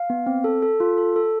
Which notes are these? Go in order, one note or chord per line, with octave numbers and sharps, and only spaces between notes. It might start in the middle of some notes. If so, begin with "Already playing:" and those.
Already playing: F5
B3
C4
A4
A4
F4
A4
A4